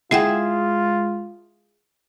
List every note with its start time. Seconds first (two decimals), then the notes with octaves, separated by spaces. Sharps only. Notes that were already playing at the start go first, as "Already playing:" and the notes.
0.11 G#3 E4 F4 G#4 E5 F#5 G5